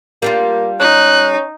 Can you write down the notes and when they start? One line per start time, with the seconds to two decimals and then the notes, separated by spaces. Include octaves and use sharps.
0.22 G3 A#3 D4 F4
0.80 C#4 D#4 F#6